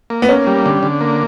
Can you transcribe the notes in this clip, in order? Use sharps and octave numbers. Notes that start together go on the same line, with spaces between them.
A#3
B3
A#3 C#4
G3
D3
D3
A#3